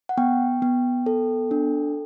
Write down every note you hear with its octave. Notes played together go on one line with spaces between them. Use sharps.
F#5
B3 G5
B3
A4
D4